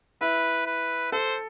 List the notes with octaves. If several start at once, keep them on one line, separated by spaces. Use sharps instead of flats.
E4 B4
B4
A4 C5